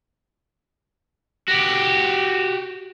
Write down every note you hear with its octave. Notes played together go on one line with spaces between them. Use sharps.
F#4 G4